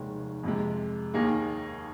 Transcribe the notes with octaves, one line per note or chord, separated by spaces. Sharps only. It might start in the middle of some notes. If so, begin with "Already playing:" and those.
Already playing: F1 D#2 D#3 G#3
F2 C3 G#3
D#2 D#3 A#3 D#4 G#4